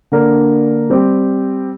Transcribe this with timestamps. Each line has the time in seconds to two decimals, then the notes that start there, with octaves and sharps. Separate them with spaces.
0.12 D3 A#3 D4 A#4
0.90 G3 C4 G4